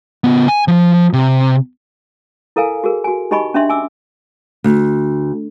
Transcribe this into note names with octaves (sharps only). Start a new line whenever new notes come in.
C#3 B3
G#5
F3
C3
E4 A4 A#4 F5 G#5
F#4 G#4 A#4
F#4 G#5
D#4 G4 D#5 G#5 B5 C#6
C#4 D4 E5 C6
G#5 D6 E6
D2